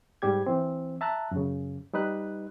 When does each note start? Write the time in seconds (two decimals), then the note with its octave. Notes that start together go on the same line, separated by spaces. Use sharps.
0.22 G#2 G3 G4 G#6
0.46 E3 C4
1.01 E5 A5 A#5 F#6
1.31 F#2 C#3
1.93 G3 D#4 B4 F#6